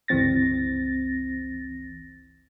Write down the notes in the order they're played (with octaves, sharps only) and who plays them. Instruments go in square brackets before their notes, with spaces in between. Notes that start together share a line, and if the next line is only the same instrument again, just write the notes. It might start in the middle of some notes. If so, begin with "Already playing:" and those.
[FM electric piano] G1 C#2 E3 C4 A6 A#6